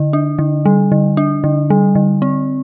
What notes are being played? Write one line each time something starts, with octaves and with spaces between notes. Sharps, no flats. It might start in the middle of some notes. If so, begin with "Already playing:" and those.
Already playing: D3
D4
D3
G3
D3
D4
D3
G3
D3
C4